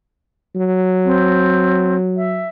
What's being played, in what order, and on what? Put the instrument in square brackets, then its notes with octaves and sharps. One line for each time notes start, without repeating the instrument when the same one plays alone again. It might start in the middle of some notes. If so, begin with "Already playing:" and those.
[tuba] F#3
[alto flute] C4
E5